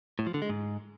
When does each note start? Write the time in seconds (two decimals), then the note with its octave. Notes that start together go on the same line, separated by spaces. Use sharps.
0.19 A2
0.27 F3
0.34 D3
0.42 G#3
0.49 G#2